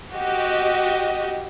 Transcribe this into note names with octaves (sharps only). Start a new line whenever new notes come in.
F#4 G4 D#5